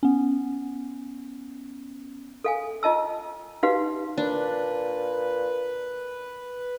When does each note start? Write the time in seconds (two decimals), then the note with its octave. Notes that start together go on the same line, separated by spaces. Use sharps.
0.03 B3 C#4
2.44 A4 F5 G#5
2.83 F4 D#5 A5 E6
3.63 D#4 F#4 G4 B4 F5
4.18 A#2 D4 B4